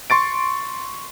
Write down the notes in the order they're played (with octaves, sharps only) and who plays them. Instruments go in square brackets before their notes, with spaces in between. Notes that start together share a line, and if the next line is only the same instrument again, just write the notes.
[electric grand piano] C6 C#6 A6 D7